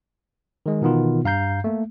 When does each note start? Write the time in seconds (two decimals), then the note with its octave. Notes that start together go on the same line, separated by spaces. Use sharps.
0.66 D#3 G#3
0.82 B2 D#3 E3 B3 D#4 F4
1.24 G2 F5 A#5 G6 C7
1.64 A3 A#3